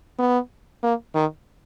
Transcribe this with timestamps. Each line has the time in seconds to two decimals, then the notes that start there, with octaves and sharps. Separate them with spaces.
0.19 B3
0.83 A#3
1.15 D#3